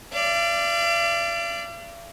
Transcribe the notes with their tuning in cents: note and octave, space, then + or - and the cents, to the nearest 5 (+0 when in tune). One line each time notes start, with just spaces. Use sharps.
D5 +0 F5 -45